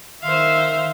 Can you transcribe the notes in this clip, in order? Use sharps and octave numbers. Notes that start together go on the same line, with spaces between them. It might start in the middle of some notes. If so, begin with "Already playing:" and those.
D#3 C5 E5 F5